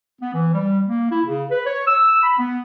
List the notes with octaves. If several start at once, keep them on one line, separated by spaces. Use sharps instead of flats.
B3
E3
G3
A#3
E4
C#3
B4
C#5
E6
B5
B3